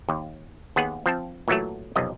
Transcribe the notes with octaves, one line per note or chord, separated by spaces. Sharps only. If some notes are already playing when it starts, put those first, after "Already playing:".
D#2
D#2 B3 G#4 F#5
F3 C4 A5
A#2 E3 F#3 A3
B1 F2 C3 D#5